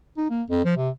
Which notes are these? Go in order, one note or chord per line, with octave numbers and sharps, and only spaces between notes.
D#4
A#3
F2
F3
C3